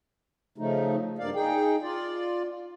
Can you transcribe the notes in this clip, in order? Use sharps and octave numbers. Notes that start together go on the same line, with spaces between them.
C#3 F3 A3 D#4
G2 A#3 D5 F5
D#4 G#4 G5
F4 D5